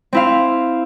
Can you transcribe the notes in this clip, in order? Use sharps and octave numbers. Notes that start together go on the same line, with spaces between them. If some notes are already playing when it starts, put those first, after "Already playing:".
C4 E4 F5